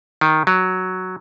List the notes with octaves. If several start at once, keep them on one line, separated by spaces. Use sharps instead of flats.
D#3
F#3